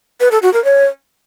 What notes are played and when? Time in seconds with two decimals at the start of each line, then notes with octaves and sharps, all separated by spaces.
0.20 B4
0.31 A4
0.43 F#4
0.54 A#4
0.65 C#5